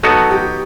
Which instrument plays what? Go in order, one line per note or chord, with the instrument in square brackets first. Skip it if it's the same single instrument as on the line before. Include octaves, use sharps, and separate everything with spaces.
[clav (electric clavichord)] F#3 B3 D#4 F#4 [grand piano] A4
[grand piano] G4